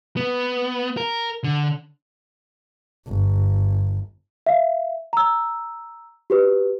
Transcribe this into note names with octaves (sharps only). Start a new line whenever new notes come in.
B3
A#4
D3
G1
E5 F5
A#5 E6
F#4 G4 B4